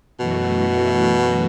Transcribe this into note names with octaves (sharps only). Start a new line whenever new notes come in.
F#2 B2 E3 A3 F#4